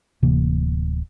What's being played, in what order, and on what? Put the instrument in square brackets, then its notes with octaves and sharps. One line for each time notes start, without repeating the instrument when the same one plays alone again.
[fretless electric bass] D1 C3 E3 A#3